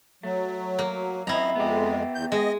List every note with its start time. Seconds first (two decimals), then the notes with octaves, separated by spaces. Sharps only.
0.23 F#3 A3
0.79 A#3
1.27 F#2 C4 E4 D#5 A#5
1.55 F2 G#3 B3 G4
2.15 E2 G6
2.32 G#3 D#5